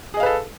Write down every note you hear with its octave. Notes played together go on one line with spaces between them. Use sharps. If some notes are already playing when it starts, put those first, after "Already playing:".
G#4 A4 B4 D#5 F5